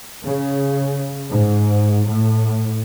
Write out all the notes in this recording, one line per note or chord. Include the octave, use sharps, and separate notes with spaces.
C#3
G#2
A2